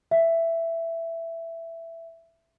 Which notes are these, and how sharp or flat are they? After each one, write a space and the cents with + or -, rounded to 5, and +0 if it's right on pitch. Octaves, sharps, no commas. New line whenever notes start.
E5 +10